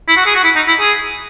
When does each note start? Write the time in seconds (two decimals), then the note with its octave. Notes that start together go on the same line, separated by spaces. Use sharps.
0.08 E4
0.17 F#4
0.26 G#4
0.35 F#4
0.44 E4
0.56 D#4
0.68 E4
0.80 G#4